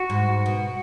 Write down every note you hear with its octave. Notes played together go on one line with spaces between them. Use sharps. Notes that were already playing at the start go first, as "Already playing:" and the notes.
Already playing: F#4
G#2
B2